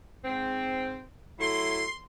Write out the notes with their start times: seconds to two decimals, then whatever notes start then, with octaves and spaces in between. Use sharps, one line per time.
0.25 G#2 C4
1.40 F#3 A3 E4 C6